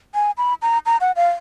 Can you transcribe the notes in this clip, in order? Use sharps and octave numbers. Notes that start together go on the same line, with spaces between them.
G#5
B5
A#5
A#5
F#5
F5